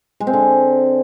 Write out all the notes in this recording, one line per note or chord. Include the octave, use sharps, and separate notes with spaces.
G#3
C4
D3